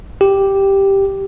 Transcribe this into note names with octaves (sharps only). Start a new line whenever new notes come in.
G4